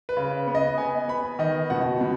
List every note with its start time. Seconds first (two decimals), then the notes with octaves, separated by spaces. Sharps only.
0.09 B4
0.17 C#3
0.47 B3
0.55 D#5
0.78 B3 G#5
1.08 B3 B5
1.39 D#3 D#5
1.70 B2 F#5
2.01 B2